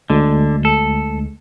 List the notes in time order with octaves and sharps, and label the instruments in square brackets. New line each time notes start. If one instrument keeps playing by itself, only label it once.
[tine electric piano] D2 G#3 [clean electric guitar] D3
[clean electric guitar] A4